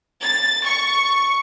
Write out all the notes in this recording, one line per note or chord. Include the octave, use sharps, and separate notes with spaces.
A6
C#6